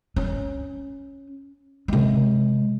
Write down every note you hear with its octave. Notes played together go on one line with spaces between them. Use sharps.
C#4
C3 G#3